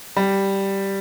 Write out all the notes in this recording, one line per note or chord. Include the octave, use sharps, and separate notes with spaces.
G3